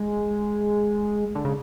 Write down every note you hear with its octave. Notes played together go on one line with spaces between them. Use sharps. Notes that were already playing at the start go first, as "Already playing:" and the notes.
Already playing: G#3
D3
C#3